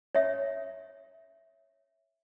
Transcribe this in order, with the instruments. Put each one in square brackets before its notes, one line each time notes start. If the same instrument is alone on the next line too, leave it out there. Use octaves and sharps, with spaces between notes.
[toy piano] C#5 E5